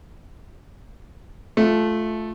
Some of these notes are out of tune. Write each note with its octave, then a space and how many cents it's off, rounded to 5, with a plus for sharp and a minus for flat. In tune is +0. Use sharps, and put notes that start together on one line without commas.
A3 -15 F4 +0